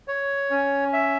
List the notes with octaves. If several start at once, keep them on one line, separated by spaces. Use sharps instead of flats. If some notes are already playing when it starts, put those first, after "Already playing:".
C#5
C#4
E5